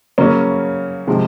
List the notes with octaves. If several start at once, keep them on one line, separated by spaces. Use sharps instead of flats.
C#3 F#3 A#3 C#4
C3 F3 G#3